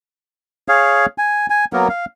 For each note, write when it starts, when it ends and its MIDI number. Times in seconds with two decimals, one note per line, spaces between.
0.68 1.06 68
0.68 1.06 73
0.68 1.06 77
1.18 1.46 80
1.50 1.65 80
1.73 1.88 54
1.73 1.88 58
1.73 1.88 59
1.73 1.88 70
1.89 2.05 77